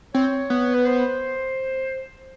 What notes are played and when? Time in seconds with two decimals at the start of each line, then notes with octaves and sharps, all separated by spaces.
0.14 C4 C#5
0.50 B3
0.74 B4
0.86 C5